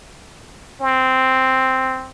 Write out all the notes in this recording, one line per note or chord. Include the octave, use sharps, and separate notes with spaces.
C4